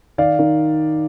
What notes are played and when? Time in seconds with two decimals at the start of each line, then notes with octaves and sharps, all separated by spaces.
0.18 D#3 D5 F5
0.39 D#3